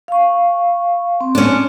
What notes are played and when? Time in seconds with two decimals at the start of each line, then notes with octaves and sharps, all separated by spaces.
0.08 F5 C#6
1.21 C4
1.35 C#4 D4